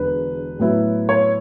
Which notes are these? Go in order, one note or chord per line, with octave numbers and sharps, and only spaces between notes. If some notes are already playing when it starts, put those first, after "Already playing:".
Already playing: E1 E2 D3 B4
A2 F#3 B3 E4
C#5